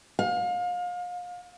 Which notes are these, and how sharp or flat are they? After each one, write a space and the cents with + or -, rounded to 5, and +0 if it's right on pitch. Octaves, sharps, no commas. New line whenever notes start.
F5 +35